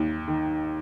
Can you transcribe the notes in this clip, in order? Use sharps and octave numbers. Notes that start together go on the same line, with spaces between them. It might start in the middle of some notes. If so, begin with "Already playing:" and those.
Already playing: D#2
D#3